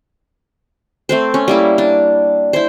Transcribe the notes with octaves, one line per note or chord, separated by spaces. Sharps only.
A3 C4 C5
C#4
G3 A#3 E4
D4
E4 C5